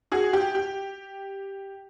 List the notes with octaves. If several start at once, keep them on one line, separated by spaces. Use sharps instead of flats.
F#4 G#4
G4
G4